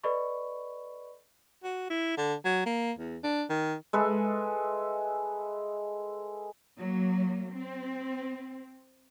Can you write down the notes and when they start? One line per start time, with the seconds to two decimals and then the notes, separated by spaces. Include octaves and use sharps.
0.03 A4 B4 D5 D#5 B5 C#6
1.64 F#4
1.90 E4
2.17 D3
2.45 F#3
2.66 A#3
2.98 E2
3.23 D4
3.50 D#3
3.93 G#3 A4 B4 E5
6.78 F#3 A#3
7.53 C4